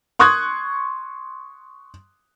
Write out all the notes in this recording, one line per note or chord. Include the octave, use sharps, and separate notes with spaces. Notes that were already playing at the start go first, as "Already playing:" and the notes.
C6 C#6 D#6 F#6 G#6